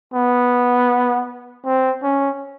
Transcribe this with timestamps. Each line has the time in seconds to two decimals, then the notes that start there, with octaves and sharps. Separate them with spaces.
0.14 B3
1.66 C4
2.03 C#4